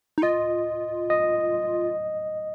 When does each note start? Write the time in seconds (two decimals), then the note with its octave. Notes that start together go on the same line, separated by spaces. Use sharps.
0.18 D#4
0.22 F4 D#5
1.10 D#5